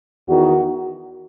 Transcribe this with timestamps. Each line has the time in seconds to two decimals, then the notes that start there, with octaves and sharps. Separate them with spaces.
0.28 E2 D#3 F#4